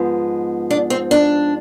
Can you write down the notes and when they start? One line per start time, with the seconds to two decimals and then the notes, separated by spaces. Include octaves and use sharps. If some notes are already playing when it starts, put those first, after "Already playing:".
Already playing: G#2 F3 G#3 B3
0.70 D4
0.90 C4
1.11 D4